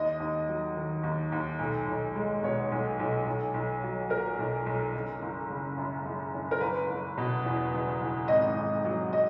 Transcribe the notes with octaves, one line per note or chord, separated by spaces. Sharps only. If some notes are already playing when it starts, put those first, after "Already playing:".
Already playing: D#2 D#5
D#2
F#3
D#3
D#2
D#2
B1
B1
G#3
B2 C#5
B1
B1
B1
B1
F#3
A#2 A#4
B1
B1
F#1
F#1
C#3
F#2
F#1
F#1
A#4
F#1 B4
F#1
B2
E2
F#1
F#1
G#1 D#5
G#1
F#3
D#5